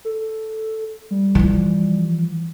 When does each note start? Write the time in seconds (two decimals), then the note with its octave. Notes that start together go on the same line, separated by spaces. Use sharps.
0.05 A4
1.11 G3
1.35 E3 F3